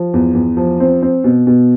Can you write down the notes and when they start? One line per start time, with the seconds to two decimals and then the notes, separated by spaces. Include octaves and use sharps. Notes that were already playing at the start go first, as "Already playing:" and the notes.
Already playing: F3
0.14 E2
0.35 E2
0.57 F3
0.80 C4
1.02 C4
1.24 B2
1.47 B2